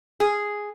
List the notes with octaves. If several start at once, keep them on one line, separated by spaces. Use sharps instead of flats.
G#4